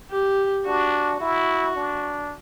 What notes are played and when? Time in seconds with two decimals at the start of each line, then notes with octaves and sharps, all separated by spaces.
0.11 G4
0.65 D4 F#4
1.20 E4 F#4
1.76 D4